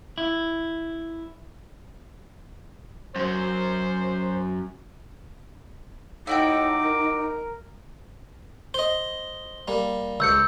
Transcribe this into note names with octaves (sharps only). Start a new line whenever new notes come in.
E4
F#2 F#3 C5
A2 D#4 E4 F#4 G5 D6
A#4
C5 D#5 G7
G3 A#3
C#2 E6 G6 C#7